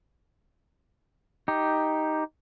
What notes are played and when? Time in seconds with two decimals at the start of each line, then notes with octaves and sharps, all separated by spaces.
1.48 D#4 G4